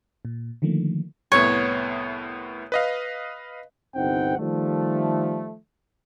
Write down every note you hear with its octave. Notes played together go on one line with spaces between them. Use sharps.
A#2
D3 D#3 F3 A3 A#3
C2 A2 B3 C#5
B4 D#5 F5
G1 C2 C4 D#4 F#5 G5
D#3 F3 G3 A3